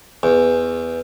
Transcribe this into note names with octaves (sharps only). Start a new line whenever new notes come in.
E2